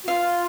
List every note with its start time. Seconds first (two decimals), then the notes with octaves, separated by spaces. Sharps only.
0.03 F#4
0.08 F4 F5